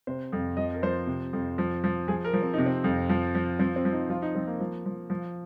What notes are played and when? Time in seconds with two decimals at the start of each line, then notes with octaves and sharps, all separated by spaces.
0.07 C3 C5
0.32 F2
0.57 F3 D#5
0.74 A#4
0.83 F3 C5
1.07 C3
1.33 F2
1.58 F3
1.84 F3
2.08 F3 G#4
2.24 A#4
2.33 F3
2.42 C4
2.53 C3 D#4
2.66 C4
2.84 F2
3.09 F3
3.35 F3
3.59 F3 C4
3.76 C4
3.85 F3
3.92 D#4
4.10 F3 F4
4.22 D#4
4.35 F3 C4
4.47 A#3
4.60 F3
4.86 F3
5.10 F3